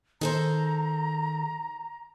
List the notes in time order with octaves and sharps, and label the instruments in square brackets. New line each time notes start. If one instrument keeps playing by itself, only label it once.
[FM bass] D#3 [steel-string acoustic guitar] G#4 A4 C5 [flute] A#5